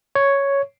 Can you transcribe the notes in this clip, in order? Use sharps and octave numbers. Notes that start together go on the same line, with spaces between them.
C#5